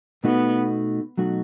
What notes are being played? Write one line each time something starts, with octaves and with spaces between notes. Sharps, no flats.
B2 A3 B3 D#4 F#4
B2 F#3 A3 D#4 F#4